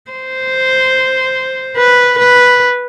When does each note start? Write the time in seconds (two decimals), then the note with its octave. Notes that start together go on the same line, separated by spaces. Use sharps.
0.11 C5
1.77 B4
2.19 B4